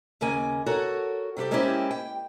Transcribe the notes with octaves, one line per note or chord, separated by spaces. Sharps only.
D#2 C#3 A#3 G#5
F#4 A4 A#4 C#5
C3 G3 F#4 G4 A4
G#3 A#3 C4 C#4 E4 G4
G5